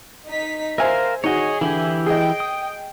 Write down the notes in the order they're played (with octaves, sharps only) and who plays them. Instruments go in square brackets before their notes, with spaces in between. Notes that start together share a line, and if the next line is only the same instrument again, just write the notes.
[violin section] D#4 B6
[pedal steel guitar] A#4 F5 [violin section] C5 [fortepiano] E5 G#5
[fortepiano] D#4 F#4 [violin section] G#4 [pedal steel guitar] C#5 D#5
[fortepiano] D3 [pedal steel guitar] E3 E4 G4
[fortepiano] G#4 D#5 [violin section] G5
[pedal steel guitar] D#6